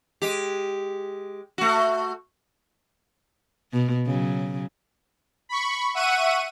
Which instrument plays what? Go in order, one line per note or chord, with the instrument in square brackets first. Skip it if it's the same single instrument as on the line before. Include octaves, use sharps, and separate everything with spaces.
[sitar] G#3 G4
A3 F#4
[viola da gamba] B2
C#3 F#3
[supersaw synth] B5 C#6
E5 F#5 C#6 D#7